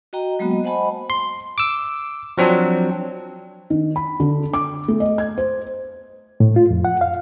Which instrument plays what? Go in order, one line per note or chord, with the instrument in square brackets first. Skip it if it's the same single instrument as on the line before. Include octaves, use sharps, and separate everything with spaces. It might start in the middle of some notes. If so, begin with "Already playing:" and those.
[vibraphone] F#4 D#5 G5 A#5
F#3 G#3 A#3 B3 F#4
D#5 A#5
C5 D#5 F#5 G#5 A5 B5
[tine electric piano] C6
D6 E6
F3 F#3 C4 D4
[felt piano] D#3
B5
D3
D6
A3
D#5
G#6
C5
[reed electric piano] A2
F4
F2
F#5
F5